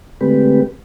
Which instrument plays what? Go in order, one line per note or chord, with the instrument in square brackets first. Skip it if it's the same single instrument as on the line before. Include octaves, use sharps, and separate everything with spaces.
[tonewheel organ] D3 G#3 A3 C4 G4 B4